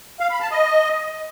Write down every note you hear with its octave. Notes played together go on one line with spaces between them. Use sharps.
F5
B5
A5
D#5